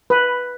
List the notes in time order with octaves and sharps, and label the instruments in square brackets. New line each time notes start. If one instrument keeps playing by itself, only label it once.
[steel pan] B4